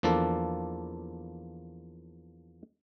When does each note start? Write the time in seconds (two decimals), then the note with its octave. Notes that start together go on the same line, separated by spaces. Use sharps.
0.03 E2 F3 A#3 D4 A4